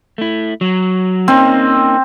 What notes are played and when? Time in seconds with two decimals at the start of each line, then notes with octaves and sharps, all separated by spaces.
0.18 A3 E4
0.61 F#3
1.28 A#3 C4 C#4 D#4